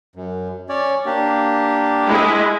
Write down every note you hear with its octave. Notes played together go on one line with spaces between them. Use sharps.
F#2
C#4 C#5 D5
A#3 D4 G4
G#3 E4